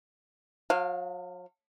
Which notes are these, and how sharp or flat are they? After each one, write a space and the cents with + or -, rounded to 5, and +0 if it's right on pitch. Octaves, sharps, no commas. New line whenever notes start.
F#3 -40 F5 +0